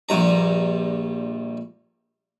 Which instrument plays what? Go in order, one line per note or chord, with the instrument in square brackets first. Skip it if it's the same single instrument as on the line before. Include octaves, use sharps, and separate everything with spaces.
[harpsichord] A#1 G2 A#5